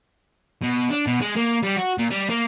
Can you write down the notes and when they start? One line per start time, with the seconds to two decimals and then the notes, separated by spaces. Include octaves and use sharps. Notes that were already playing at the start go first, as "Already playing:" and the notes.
0.63 B2
0.90 D4
1.07 B2
1.21 G#3
1.36 A#3
1.63 G3
1.76 F#4
1.98 A#2
2.10 G3
2.30 A#3